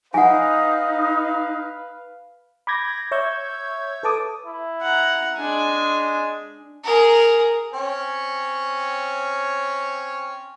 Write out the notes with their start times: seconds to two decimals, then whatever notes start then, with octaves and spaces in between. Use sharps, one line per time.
0.14 D#4 B4 F5 F#5 G#5
2.67 B5 D6 G6 G#6 A#6
3.11 C#5 E5 C#6 E6 G6 G#6
4.03 A4 B4 A5 D6 D#6
4.46 E4
4.82 F#5 A#5
5.37 G#3 D4 G#5
6.84 G#4 A#4
7.74 C4 C#4 C#5